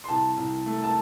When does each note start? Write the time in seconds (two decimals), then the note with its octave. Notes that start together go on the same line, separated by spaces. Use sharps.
0.04 C6
0.09 C2 A5
0.37 C2
0.66 A3
0.84 A5